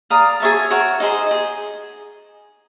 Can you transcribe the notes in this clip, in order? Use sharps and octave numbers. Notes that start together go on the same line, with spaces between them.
D5 F5 A#5 D#6
G#4 C#5 E5 A5
F#4 A#4 C#5 F#5
D#4 G#4 C5 D#5
G#4